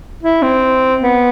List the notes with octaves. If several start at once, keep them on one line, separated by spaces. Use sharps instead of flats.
E4
C4
B3